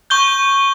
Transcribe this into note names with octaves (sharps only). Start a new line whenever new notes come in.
C#6 G6 G7